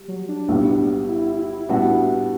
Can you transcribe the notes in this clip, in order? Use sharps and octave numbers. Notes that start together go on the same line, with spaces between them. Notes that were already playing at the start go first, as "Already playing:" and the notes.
Already playing: G3
F#3
D4
B1 A2 G3 B3
E4
E4
A2 G3 B3 D4 F#4